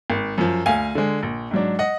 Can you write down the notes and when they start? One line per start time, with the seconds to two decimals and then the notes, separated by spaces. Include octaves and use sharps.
0.10 G#1
0.38 F#2 F3
0.66 D2 F5 G#5
0.95 D3 G#3
1.23 A#1
1.51 G#2 F#3 D4
1.79 D#5 F#5